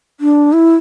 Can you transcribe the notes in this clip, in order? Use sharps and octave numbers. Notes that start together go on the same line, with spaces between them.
D4
E4